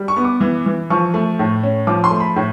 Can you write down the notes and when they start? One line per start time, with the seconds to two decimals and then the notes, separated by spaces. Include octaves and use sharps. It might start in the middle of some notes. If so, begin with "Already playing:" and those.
Already playing: G3
0.08 C#6
0.17 B3
0.25 D6
0.41 E3
0.66 E3
0.90 F3 C#6
1.14 A3
1.39 A2
1.63 C#4
1.87 F3 D6
2.04 C6
2.11 A3
2.20 B5
2.36 A2